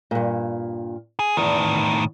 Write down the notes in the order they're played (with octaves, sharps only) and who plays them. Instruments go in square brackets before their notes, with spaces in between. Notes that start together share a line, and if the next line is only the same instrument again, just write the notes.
[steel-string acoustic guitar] G2 A#2
[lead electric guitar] G#4
[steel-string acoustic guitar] E2 [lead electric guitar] A2 D#3